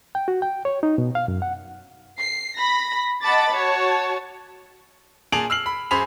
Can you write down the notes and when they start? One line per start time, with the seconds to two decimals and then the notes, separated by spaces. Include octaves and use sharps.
0.15 G5
0.28 F#4
0.42 G5
0.65 C#5
0.83 D#4
0.98 B2
1.15 F5
1.28 F#2
1.42 F#5
2.19 C7
2.57 B5 A#6
3.22 D#5 F#5 A5 B5 D6 A6
3.52 F#4 C#5 A5
5.32 A#2 G#4 A5 D7 F7 F#7
5.50 E6 F6 C7 F#7
5.66 B5
5.91 F#2 G#4 C5 B5 B6 F7